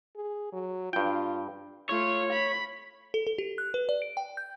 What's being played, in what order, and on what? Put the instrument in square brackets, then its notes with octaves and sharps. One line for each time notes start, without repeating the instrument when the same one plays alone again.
[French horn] G#4
F#3
[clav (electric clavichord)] G2 G5 [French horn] F4
[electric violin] A3 F4 [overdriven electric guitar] C#5
[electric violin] B5
[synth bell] A4
A4
G4
F#6
B4
D5
D7
G5
G6